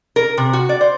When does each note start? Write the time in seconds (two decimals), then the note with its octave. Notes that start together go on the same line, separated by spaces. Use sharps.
0.16 A#4
0.38 C3
0.53 F#4
0.69 D5
0.81 C5